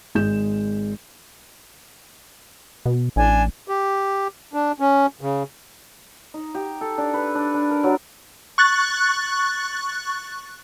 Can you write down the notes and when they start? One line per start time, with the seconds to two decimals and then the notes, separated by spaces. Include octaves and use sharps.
0.15 G#1 G#3 G6 E7
2.86 B2
3.16 A1 D4 G#5
3.68 G4
4.53 D4
4.80 C#4
5.21 C#3
6.34 D#4
6.55 G4
6.81 A4
6.98 D4
7.14 B4
7.35 D4
7.54 D4
7.71 A#4
7.84 F#3
8.58 C#6 F#6 A6